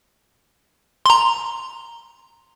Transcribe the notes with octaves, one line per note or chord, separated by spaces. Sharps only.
A#5 C6